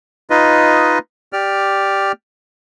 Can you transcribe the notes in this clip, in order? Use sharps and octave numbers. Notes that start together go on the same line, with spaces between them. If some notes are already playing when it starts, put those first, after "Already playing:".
D#4 F4 B4 D#5
G4 D5 F6